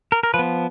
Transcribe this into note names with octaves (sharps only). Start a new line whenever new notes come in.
A#4
A#4
F3 B4
B3